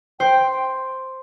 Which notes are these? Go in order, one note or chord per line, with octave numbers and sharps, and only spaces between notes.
C5 G5